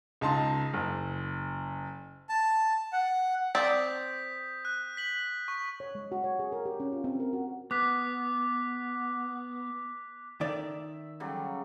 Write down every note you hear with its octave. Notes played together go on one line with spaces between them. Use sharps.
C#2 D#4 A5 C6
F#1
A5
F#5
C4 D5 D#6 G6 B6
F#6
B6 F#7
C#6
C#5
G#3
F#4
C#5
G#4
A#4
G4
C#4
F4
C4
A#4
F#4
B3 D6 F#6 B6
D#3 D5 E5
C#3 F#3 G3